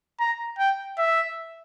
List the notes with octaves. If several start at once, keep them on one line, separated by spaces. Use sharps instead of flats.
A#5
G5
E5